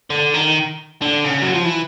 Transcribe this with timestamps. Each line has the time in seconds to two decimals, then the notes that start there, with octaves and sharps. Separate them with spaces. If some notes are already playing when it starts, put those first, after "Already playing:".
0.10 D3
0.34 D#3
1.02 D3
1.25 C#3
1.42 F#3
1.54 F3
1.65 E3